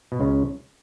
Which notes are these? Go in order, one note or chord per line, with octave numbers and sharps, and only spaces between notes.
B2
C#2 C#3